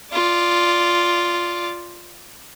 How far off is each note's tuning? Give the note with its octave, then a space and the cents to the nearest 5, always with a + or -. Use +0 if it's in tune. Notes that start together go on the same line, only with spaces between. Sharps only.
F4 +0 D5 +0